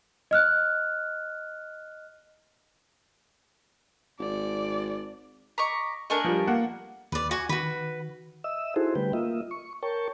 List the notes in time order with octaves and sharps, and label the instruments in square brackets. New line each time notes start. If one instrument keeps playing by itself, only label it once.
[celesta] D#5 F6 F#6
[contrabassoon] G#1 [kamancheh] D5
[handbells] D#5 D6 B6 [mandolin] A#5 C#6
[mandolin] A3 D4 A#4 [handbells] D#5 G#5 A5
[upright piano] F3 G3
A#3 F#5
[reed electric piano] D#2 [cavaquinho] B4 D5
[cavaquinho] F#4 G#5 C#6
[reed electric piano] D#3 [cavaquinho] F#4 B4
[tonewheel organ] D#5 E5 E6
D#4 E4 F#4 G#4 A4 C5
D3 G3 A3 B4 G5
A#3 F4 D#5 E5
C#6
A#4 C#5 G5 A5 C#6